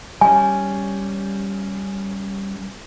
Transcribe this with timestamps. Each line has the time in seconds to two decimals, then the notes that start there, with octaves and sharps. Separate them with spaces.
0.21 G3 C#4 G#5